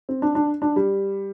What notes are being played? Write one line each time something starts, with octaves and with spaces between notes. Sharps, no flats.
C4
D4
D4
D4
G3